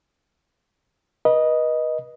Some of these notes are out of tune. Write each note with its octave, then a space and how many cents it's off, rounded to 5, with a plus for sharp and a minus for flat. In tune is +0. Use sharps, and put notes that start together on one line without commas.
B4 -30 D#5 +0